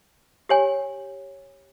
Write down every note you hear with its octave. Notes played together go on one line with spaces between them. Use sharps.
G4 C#5 G#5